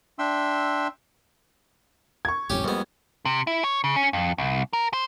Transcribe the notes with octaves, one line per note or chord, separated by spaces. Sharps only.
D4 E5 G5 C6 E6
C#6 G#6
D#1 G#1 F2 C#4 G4
F2 G3 G#3 A#3 B3
C3
E4
C#5
C#3
C#4
F2
C2
A#4
C5